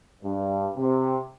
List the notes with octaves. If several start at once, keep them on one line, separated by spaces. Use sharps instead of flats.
G2
C3